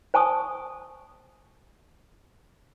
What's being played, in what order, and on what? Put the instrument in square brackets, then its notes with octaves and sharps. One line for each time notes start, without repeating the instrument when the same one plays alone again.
[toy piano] C5 G#5 A5 C#6 D#6